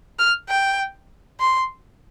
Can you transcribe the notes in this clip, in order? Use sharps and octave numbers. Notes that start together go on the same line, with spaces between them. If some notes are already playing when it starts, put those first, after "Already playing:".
F6
G5
C6